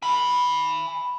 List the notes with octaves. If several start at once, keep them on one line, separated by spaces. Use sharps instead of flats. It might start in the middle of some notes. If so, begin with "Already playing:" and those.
G#5 B5